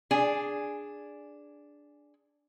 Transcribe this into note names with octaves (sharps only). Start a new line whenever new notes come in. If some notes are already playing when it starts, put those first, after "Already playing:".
D4 G#4 G#5